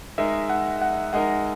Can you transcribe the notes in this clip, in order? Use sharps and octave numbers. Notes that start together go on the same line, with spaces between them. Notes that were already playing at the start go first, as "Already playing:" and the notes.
G#3 D#4 A#4 E5
F#5
F#5
G#3 D#4 A#4 F#5